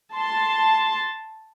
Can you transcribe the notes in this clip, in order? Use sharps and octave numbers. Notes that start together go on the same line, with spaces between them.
A5 C6